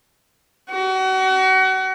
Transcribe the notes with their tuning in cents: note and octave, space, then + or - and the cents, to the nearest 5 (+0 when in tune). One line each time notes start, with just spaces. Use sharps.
F#4 +35